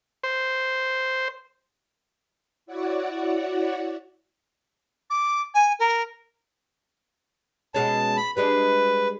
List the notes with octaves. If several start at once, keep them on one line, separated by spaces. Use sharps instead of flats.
C5
E4 F#4 C#5 D5 F#5
D6
G#5
A#4
B2 G#3 C#4 A5
B5
G3 G#3 D4 B4